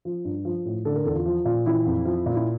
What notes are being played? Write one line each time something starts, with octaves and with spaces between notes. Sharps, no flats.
F3
G2
F3
A2
D3 A4
A#4
E2 A4
F4
F3
A#2
E3 E4
F2
F3
A#2
E4